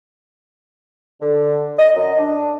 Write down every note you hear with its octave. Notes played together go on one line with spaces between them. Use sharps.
D3
D#5
F#2
D4